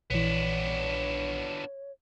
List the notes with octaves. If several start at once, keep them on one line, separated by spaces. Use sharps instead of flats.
A#1 E3 B3 D4 C#5